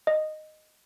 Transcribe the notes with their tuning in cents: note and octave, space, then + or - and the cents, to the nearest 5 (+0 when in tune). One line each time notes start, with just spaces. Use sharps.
D#5 -10